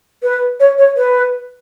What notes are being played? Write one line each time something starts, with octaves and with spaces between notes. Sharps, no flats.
B4
C#5
C#5
B4